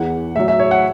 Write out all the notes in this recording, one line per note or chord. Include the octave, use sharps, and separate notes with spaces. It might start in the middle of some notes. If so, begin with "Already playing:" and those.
Already playing: E2 E3 F#5
A2 F#3 E5
E5
C#5
F#5